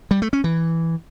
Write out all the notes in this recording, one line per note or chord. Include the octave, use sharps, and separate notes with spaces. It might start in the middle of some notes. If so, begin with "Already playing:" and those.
G3
A3
C#4
E3